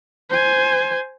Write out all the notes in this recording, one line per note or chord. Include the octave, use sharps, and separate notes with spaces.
C5 G#5